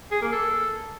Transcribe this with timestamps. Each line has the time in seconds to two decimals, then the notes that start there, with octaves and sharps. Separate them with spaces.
0.12 G#4
0.22 A#3
0.32 A4